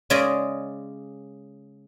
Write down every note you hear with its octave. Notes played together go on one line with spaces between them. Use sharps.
C#3 G#3 C#4 G#4 D5 D#5